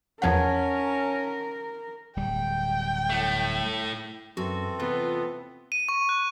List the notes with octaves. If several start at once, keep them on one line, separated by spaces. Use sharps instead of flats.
E2 F3 C#4 A#4 F5 F#5 A5 G#6
D1 G3 G5
A2 A3
F#2 E3 C4 F#4 A4
E2 C3 B3 F4 F5
D#7
C#6
F#6